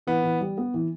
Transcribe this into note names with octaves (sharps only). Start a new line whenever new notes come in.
E3 B3
E3
G3
B3
E3